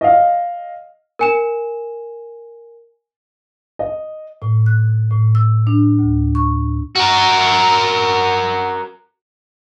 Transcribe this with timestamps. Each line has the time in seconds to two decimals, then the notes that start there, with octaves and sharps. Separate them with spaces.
0.01 D#5 F5
1.19 A#4 G#5 E7
3.79 D#5
4.42 A2
4.66 F#6
5.11 A2
5.35 E6
5.67 D4
5.99 D2
6.35 C#6
6.95 F#4 A#4